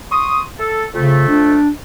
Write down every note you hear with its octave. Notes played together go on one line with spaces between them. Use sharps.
C6 C#6 D#6
A4
F2 C#3 A3
D4